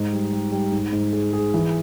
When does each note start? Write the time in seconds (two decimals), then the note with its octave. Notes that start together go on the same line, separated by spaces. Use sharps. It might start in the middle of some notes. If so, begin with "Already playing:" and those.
Already playing: G#2 D#4
0.13 G3
0.32 G3
0.52 G3
0.72 G#2
0.92 G#2
1.12 G#4
1.33 G#4
1.54 E3